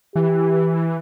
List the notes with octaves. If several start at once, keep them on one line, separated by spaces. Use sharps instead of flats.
E3 G4